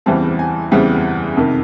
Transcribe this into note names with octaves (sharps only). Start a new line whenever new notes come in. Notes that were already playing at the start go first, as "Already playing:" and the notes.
E2 C#3 E3 G3 C4 A5
G#5
E2 C#3 E3 G3 C4
F2 C3 D#3